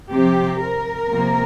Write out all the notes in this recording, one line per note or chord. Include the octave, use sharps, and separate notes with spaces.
C3 F3 C4 G4
A#4
C3 F3 A#3